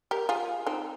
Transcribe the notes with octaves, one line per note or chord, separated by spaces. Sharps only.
G4 A#4
F4 G#4
C4 D#4